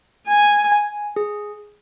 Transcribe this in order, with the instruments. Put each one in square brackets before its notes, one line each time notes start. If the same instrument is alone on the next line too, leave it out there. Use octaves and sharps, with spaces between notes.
[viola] G#5
[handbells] G#5
G#4